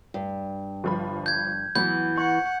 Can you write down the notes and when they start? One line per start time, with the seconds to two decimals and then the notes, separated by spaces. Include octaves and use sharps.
0.14 G2
0.84 G1 F3 B5
1.26 G6 G#6
1.75 E3 F#3 B3 B5 G6
2.17 F#5 C#6